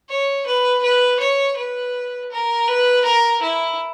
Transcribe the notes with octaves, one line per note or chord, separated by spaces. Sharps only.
C#5
B4
B4
C#5
B4
A#4
B4
A#4
E4